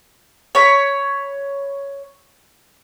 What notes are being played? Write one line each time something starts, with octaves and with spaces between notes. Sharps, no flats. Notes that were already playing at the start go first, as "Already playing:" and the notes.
C#5 B5